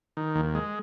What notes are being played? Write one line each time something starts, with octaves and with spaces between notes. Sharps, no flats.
D#3
D#2
G#3